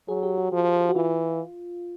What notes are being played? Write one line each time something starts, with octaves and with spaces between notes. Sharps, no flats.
F#3 G#4
G4
F#4
F3
F#4
E3 F4